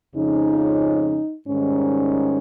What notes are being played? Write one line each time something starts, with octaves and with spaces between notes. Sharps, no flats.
F2 C#3 F3 G#3 C#4 D#4
G#2 D#3 G3 C#4